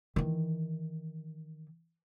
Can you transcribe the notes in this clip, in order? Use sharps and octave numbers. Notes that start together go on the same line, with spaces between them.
D#3 E3